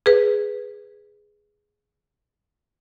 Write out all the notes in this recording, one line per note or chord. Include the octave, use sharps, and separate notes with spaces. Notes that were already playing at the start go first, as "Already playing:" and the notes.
G#4 B4